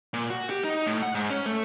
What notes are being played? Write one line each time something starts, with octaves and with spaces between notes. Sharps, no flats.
A#2
F#4
G4
D#4
A2
F#5
G#2
C#4
A3